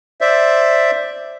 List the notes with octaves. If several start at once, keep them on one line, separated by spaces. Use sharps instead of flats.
C5 D5 E5